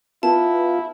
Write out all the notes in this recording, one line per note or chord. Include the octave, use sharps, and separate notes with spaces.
B3 E4 F4 A5